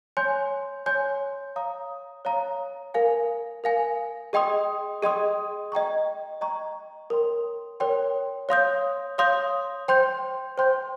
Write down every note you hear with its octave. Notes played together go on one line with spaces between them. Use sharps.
C#5 G#5 C6 G6
C#5 G#5 C6 G6
C#5 F5 A#5 D#6
C#5 F5 A#5 D#6
A#4 F5 G#5
A#4 F5 G#5
G#4 D#5 G5 C6 D#6
G#4 D#5 G5 C6 D#6
D#5 G5 A#5 C#6
D#5 G5 A#5 C#6
A#4 C#5 G5 C6
A#4 C#5 G5 C6
C#5 F5 C6 D#6 G6
C#5 F5 C6 D#6 G6
C5 G5 C6 G6
C5 G5 C6 G6